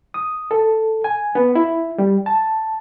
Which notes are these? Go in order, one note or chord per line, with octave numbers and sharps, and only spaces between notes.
D#6
A4
G#5
B3
E4
G3
A5